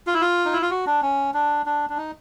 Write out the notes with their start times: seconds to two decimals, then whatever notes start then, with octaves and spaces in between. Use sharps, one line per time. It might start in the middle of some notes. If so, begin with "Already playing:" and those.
0.07 F4
0.14 E4
0.21 F4
0.45 D#4
0.53 E4
0.62 F4
0.71 F#4
0.86 D4
1.02 C#4
1.34 D4
1.66 D4
1.90 D4
1.97 D#4